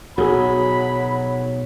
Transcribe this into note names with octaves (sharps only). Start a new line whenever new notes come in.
B1 F#3 F#4 G#4 B5